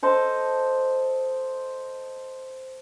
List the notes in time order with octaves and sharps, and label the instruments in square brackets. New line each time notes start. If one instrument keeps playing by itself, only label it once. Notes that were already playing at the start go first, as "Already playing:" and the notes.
[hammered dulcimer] A4 C5 D#5 A5